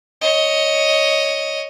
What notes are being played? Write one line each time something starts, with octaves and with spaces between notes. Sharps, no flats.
C#5 D#5